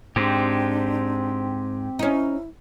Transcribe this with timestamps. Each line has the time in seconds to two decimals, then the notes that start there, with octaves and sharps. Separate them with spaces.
0.16 G#2 C4 D4 G4
1.99 C#4 D#4 E4